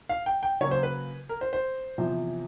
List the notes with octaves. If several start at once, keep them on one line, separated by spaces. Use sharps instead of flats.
F5
G5
G5
C#3 F#3 A#3 C#5
C5
B4
A#4
C5
C5
E2 C3 F3